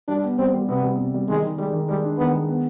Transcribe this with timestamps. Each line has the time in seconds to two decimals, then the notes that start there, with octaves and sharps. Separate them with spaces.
0.09 G3 D4
0.24 B3
0.38 G3 C4
0.54 G3
0.68 C3 B3
0.83 G3
0.98 C3
1.14 G3
1.29 D#3 G#3
1.44 D#3
1.58 G3 G#3
1.73 D#3
1.89 G3 G#3
2.04 D4
2.18 D#3 B3
2.33 G#3
2.48 B3